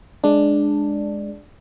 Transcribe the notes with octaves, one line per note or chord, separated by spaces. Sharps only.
G#3 D4